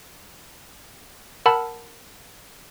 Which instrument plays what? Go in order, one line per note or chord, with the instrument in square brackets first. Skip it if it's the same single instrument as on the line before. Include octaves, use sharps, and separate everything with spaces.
[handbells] A#4 F#5 A5 B5 E6